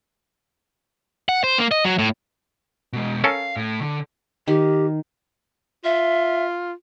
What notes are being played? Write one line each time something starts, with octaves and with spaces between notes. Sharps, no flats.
F#5
C5
A#3
D#5
F#3
A2
B2 G#3
C#4 A4 A#4 F5
A2
D3
D#3 G4
F4 E5